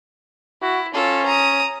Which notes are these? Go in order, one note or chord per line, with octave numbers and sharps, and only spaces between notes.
E4 F#4
C#4 F4 A4
A#5 D#6